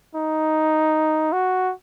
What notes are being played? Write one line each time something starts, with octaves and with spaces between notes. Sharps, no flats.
D#4
F#4